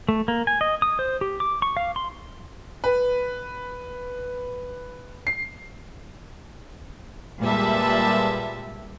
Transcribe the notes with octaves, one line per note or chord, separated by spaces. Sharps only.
A3
A#3
G#5
D#5
D#6
C5
G4
D6
C#6
F5
C6
B4
C7
A#2 G3 G#3 B4 E5 A5